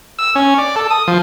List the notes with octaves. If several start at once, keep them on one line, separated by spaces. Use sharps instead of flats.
E6
C#4
D5
A4
D#6
F3